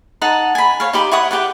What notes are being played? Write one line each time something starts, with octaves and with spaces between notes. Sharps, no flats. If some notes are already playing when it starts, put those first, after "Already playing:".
D#4 F#5 A5
G#5 B5
C#5 F5
D#4 G4 B5
E4 C#5 F#5 D#6
G4 B4 F#5